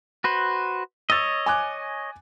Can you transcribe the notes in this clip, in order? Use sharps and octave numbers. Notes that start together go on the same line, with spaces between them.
F#4 B4 C5
C#5 D#5 E6 A6
G#5 D6 F#6